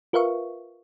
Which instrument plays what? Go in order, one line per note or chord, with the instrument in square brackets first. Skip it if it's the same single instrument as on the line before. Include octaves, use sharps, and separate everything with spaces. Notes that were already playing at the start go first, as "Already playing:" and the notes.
[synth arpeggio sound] F4 A#4 B4 E5 F5 C#6